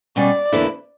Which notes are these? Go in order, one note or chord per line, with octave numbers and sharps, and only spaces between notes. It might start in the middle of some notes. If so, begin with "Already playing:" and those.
B2 G3 C#4 D5
E2 D3 A#3 E4 B4